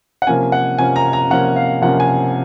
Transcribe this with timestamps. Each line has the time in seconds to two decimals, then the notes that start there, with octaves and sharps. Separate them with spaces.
0.22 F#5
0.27 C3 F3 A#3 C#4 G#5
0.52 F#5
0.78 C3 F3 A#3 C#4 G#5
0.96 A#5
1.13 A#5
1.30 C3 F3 A#3 C#4 F#5
1.56 F5
1.82 C3 F3 A#3 C#4 F#5
2.00 G#5